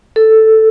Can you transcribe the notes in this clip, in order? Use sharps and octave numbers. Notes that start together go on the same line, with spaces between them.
A4